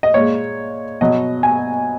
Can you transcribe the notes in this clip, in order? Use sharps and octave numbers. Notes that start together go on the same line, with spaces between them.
D#5
A#2 G#3 C#5
B2 F#3 D#5
G#5